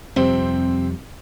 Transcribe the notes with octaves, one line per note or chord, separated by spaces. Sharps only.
F2 C3 G3 C4 C5